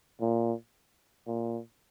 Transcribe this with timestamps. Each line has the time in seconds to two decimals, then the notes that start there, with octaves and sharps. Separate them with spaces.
0.21 A#2
1.28 A#2